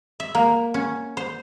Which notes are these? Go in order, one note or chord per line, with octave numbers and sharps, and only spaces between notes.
E5
A#3
C#4
C5